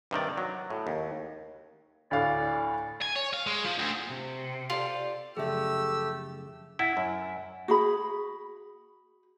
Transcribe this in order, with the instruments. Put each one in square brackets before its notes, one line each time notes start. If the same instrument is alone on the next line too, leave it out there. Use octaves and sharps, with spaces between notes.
[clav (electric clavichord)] G2 C3 D#3 D5
F#3
A2
D#2
[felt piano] D2 A2 F5 [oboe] D5
[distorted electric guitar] G#5
C#5
F5
G#3
F3
D2
[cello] C3
[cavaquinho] F4 [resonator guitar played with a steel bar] G4 A4 D5
[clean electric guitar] F#2 C#3 F3 [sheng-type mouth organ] A3 G4 [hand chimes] G#4 E5 [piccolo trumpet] E6
[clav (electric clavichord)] E4 [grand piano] F#5 A6 D7
[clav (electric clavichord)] F#2
[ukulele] F#4 G#4 B5